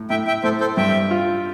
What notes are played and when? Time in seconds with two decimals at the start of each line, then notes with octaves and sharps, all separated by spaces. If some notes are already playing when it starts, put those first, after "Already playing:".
Already playing: A2
0.10 A2 E5 G5
0.27 E5 G5
0.44 A2 A4 C5
0.61 A4 C5
0.77 G2 E5 G5
1.11 F4